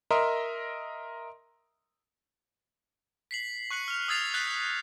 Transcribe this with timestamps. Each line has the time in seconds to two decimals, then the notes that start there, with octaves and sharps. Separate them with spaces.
0.11 A#4 D#5 E5 A#5 C6
3.31 B6 C7 F#7
3.71 C#6 F#6 C#7 F#7
3.88 F6 F7
4.08 D#6 E6 G#6 A6 C7 F7
4.34 E6 F#6 G6 A6 B6 C7